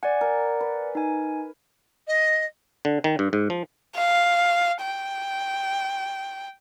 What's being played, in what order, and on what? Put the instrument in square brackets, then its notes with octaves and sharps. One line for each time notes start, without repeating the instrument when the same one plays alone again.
[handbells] D5 F#5 [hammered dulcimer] G#5
[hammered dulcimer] A#4
B4
[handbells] D#4 G#5
[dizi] D#5
[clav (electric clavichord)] D3
D#3
G2
G#2
F3
[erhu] F5
G5